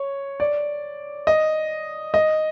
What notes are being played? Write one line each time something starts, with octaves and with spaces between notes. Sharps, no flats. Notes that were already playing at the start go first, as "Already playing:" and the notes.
Already playing: C#5
D5
D#5
D#5